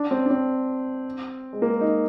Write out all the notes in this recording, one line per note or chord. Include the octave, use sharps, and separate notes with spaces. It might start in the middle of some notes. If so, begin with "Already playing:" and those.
Already playing: D4
C4
D4
C4
G#3
A#3
D#4